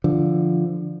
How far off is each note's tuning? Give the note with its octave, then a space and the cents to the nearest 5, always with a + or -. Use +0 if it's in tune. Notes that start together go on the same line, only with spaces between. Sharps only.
D3 +0 F3 -15